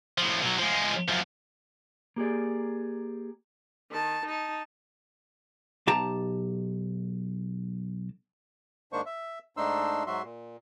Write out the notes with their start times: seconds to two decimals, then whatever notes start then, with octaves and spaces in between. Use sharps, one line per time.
0.18 A2 F3
0.43 B2 F#3
0.59 F3 G#3
1.08 F#2 F3
2.16 A#3 G4 G#4 D5
3.91 D#3 A5
4.26 D#4 A5
5.87 B1 G4 A5 A#5
8.92 G#2 D#3 A#3 D4 C5 C#6
9.06 E5
9.57 G#2 A3 D4 D#4 C6 E6
10.07 G#2 F#3 F#4 E5 C6
10.24 A#2